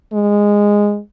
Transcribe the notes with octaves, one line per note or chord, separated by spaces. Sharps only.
G#3